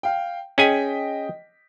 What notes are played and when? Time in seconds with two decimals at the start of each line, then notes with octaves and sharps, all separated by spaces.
0.03 F5 G5
0.58 C#4 G#4 D#5 G5 G#5 B6